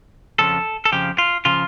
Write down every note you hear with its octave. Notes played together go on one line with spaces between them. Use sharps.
F2 C#3 F3 A4
A4
F2 C#3 F3 G4
F4
C#3 F3 F4